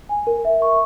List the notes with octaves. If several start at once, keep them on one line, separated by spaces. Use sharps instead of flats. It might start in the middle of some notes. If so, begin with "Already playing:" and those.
G#5
A#4
E5
C#6